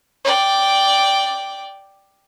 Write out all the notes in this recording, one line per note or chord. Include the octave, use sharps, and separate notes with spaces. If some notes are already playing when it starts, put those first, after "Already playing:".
D5 G5